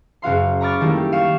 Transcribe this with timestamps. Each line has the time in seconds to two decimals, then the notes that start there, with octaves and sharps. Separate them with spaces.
0.22 F#1 F#4 F5 C6
0.61 A#5 B5 C#6 D6 F6 A6
0.81 D#3 G3 A3 A#3 E4 G4
0.96 G4
1.12 F5 C#6 E7